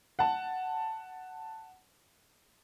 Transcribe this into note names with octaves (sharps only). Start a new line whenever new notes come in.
F#5 A5